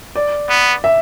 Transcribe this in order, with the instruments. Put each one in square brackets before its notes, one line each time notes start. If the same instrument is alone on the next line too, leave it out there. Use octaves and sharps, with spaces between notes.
[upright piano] D5
[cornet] B3
[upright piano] E5